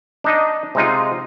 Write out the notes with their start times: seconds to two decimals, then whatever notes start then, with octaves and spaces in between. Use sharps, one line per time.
0.24 D4 D#4 D#5
0.75 C3 G#3 D#4 F4